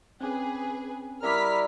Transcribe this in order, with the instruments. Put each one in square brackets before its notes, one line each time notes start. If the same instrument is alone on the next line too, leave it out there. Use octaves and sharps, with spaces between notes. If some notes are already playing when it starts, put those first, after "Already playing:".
[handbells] C4 C#4 [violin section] G#4 B4
[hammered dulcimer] G3 E4 D6 [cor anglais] A#4 [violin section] F6 B6